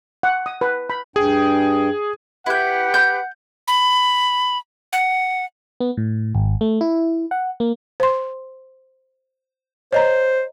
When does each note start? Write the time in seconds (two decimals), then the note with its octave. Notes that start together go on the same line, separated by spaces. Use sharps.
0.23 F#5
0.46 D#6
0.61 B4
0.90 B5
1.16 G2 G#4 G5
2.46 E4 G4 B4 F#5 G6
2.94 G6
3.68 B5
4.93 F#5
5.80 B3
5.97 A2
6.35 G#1
6.61 A3
6.81 E4
7.31 F#5
7.60 A#3
8.00 C5 C6
9.93 C5 C#5 D#5 A#5